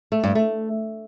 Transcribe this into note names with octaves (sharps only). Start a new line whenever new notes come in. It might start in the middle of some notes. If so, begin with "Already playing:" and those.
A3
G2
A3